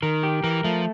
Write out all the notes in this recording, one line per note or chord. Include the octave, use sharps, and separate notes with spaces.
D#3 A#4
G4
E3 A#4
F3 A3